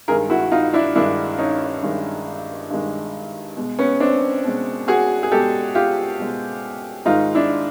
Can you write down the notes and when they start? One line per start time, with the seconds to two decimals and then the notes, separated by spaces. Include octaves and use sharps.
0.08 G2 D#3 G#3 G#4 A#4
0.30 E4 F#4
0.52 D#4 F4
0.73 D4 E4
0.95 G2 D#3 G#3 D4 E4
1.39 C#4 D#4
1.82 G2 D#3 G#3
2.70 G2 D#3 G#3
3.57 B2 G#3
3.79 B3 C#4
4.00 C4 D4
4.44 B2 G#3
4.88 F#4 G#4
5.23 G#4
5.32 B2 G#3 G4 A4
5.75 F4 G4
6.18 B2 G#3
7.06 G#2 D#3 G#3 D#4 F4
7.35 D4 E4